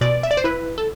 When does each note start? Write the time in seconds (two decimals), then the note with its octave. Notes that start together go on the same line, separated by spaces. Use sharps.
0.01 B2 D5
0.23 E5
0.31 D5
0.37 C5
0.44 E4 B4
0.78 A4